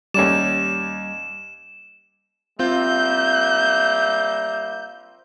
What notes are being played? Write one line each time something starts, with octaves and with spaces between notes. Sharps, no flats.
D#2 G3 C#4 D5 E7
G3 A#3 C4 F4 E5 G6